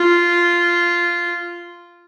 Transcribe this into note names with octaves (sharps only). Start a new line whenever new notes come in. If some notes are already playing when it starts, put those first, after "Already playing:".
Already playing: F4